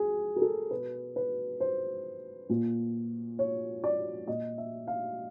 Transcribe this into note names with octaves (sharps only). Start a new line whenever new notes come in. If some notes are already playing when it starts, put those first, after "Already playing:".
Already playing: G#4
A#4
A4
B2 B4
B4
C5
A#2
C#5
D5
A#2 D#5
E5
F5